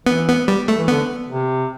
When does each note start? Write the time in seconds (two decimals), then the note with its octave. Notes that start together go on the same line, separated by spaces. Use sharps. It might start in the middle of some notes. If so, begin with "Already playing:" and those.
0.06 E3 B3
0.28 B3
0.48 G3
0.68 A3
0.78 E3
0.88 D3 B3
1.29 C3